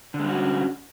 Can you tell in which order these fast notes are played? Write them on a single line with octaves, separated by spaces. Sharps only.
D3 G#3 G3 F#4 C#4